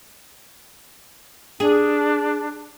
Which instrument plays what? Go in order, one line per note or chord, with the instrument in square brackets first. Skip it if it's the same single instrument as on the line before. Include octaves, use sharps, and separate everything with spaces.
[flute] D4 [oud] G#4